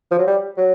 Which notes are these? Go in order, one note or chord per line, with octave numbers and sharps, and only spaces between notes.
F3
F#3
G3
F#3